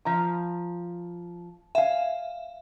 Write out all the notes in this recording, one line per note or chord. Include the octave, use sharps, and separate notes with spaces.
F3 A#5
E5 F5 G#5